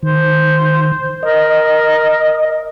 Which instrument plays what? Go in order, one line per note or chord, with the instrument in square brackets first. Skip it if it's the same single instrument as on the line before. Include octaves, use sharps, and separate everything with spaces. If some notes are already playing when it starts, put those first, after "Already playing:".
[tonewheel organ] D#3 [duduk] C5
[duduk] A#4 [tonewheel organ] D#5